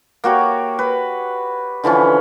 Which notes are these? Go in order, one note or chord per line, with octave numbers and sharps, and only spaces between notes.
A#3 F#4 G4 C#5
B4
D3 E3 F3 C#4